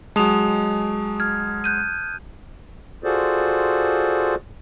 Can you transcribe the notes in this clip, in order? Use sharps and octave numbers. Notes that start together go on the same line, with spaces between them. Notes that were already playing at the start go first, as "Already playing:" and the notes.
F#3 G#3 A5 D#6 F7
F6 G#6
F#6 G6 D#7
F4 F#4 G#4 A4 C5 D5